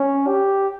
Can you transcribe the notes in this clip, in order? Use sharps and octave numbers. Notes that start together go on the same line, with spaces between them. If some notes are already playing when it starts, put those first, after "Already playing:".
Already playing: C#4
G4